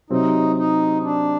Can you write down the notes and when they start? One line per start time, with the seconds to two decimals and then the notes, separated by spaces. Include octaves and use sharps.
0.10 C3 F#3 C4 D#4 G4
0.56 D#4
1.03 D4